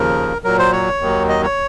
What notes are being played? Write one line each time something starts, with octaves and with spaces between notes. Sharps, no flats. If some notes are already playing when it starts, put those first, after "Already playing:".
Already playing: D#2 C#3 F3 A#4
A#2 F#3 A#4
C5
C#5
D#2 D#3 F#3
D#5
C#5